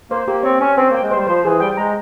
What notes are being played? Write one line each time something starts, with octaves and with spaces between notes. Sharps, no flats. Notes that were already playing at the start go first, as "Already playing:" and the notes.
A#3 C5
A#3 G4
C4 C#5
C#4 C#5
C4 C5
A#3 G5
G#3
G3 C5
F3 C5
E3 G#4
G3 G5
G#3 A#5